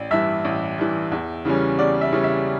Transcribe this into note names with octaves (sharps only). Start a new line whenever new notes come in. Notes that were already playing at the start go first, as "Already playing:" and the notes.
Already playing: A1 D5
G2 E3 E5
A1
G2 E3
E2
C#3 E3 G3 C#4
E2 D5
E5
C#3 E3 G3 C#4
E5